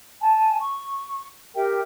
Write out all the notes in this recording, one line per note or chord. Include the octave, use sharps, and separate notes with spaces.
G#5 A5
C#6
G4 A#4 E5 G5